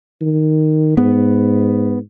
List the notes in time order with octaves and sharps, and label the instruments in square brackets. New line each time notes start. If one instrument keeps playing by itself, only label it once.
[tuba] D#3
[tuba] G#2 [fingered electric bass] B3